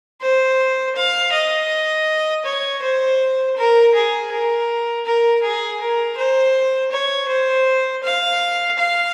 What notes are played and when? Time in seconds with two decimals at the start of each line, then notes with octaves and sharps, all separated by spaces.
0.21 C5
0.96 F5
1.33 D#5
2.45 C#5
2.82 C5
3.57 A#4
3.94 G#4
4.32 A#4
5.05 A#4
5.42 G#4
5.80 A#4
6.17 C5
6.91 C#5
7.28 C5
8.03 F5
8.78 F5